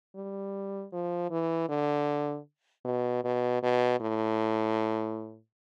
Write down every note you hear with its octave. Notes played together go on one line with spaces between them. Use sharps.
G3
F3
E3
D3
B2
B2
B2
A2